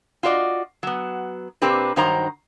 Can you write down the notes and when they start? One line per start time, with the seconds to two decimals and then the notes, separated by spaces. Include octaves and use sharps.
0.23 F4 F#4 D5 D#5
0.83 F#3 B3
1.62 A#2 C4 D4 G4 A#4 B4
1.96 G2 D#3 F#3 D#4 C5 A#5